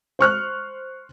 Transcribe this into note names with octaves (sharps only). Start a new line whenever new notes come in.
C5 C#6 F6 F#6